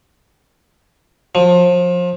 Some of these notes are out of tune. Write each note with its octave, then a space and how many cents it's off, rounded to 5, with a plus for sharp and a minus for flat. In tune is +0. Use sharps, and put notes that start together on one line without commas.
F3 +25